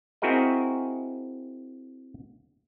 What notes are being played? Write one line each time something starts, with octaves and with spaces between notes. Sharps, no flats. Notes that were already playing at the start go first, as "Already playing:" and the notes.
C4 E4 F#4 G#4 A#4 D#5